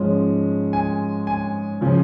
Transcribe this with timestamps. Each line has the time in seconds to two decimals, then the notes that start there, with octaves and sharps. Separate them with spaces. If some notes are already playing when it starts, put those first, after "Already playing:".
Already playing: G#2 F3 G#3 C#4
0.73 G#5
1.27 G#5
1.81 C#3 F3 C#4